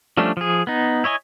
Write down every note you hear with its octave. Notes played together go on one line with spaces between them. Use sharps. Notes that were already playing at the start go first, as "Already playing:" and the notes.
F3 G3 A3 C#4 D4
F3 G#4
B3 D#4
E4 C#5 D#5 G#5